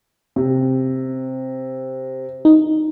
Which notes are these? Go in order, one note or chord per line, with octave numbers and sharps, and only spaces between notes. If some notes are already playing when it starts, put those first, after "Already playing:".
C3
D#4